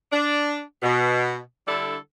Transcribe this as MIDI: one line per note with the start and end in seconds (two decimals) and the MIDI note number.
0.11 0.61 62
0.83 1.38 47
1.66 1.96 50
1.66 1.96 55
1.66 1.96 62
1.66 1.96 64
1.66 1.96 69